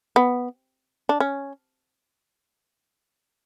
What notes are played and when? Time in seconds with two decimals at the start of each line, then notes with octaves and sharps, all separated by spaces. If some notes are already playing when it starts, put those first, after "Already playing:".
0.16 B3
1.09 D4
1.20 C#4